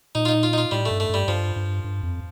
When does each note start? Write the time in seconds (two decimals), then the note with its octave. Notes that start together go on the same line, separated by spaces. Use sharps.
0.15 A#2 D#4
0.25 F4
0.29 D#4
0.43 F4
0.53 D#4
0.58 F4
0.71 A2 G3
0.86 A3
0.91 G2
1.00 A3
1.09 G2 G3
1.28 G2 F3
1.56 G2
1.84 G2
2.03 F2